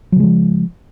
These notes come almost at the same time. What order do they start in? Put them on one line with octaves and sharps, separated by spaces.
F#3 C#3 G#3 F3